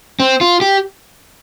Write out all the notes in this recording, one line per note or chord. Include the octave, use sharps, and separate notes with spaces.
C4
F4
G4